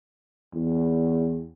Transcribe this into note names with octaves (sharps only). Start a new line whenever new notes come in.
E2